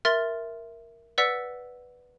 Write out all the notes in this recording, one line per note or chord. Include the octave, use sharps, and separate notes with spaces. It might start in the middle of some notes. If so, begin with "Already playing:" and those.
A#4 E5 C6 F6 A6
B4 D5 F#5 E6 B6